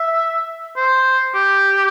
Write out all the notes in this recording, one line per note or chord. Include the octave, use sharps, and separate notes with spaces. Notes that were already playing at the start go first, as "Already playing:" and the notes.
Already playing: E5
C5
G4